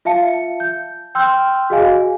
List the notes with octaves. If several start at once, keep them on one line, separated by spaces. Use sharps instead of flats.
F4 E5 F5 A5 C#7
G6
G5 C6 E6 F6 G6
F#4 G#4 D#5 F5 G#5